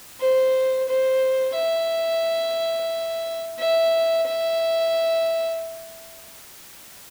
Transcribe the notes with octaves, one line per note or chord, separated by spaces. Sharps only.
C5
C5
E5
E5
E5